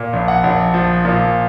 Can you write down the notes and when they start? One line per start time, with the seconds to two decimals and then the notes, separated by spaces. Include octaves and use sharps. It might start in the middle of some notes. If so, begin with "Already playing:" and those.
Already playing: A#2
0.13 A#1
0.28 F#5
0.44 A#1
0.74 F3
1.05 A#2